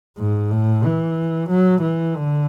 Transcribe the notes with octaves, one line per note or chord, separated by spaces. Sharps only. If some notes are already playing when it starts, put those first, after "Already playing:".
G#2
A2
E3
F#3
E3
D3